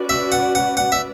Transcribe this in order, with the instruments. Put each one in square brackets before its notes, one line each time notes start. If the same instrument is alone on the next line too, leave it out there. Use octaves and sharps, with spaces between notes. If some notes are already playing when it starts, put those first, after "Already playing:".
Already playing: [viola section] C#4 F#4 B4 D5
[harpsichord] E5
F#5
F#5
F#5
E5